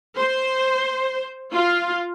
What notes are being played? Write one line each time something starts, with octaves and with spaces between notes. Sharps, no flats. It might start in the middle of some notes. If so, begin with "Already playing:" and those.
C5
F4